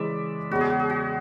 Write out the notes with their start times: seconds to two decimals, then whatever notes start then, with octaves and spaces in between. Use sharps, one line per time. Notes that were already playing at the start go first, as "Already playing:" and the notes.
Already playing: C#3 E3 G#3 D5 E5
0.51 E2 C#3 G#3 F#4
0.61 G#4
0.70 F#4
0.80 G#4
0.90 F#4